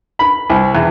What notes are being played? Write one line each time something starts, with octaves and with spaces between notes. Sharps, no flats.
B5
C2
E2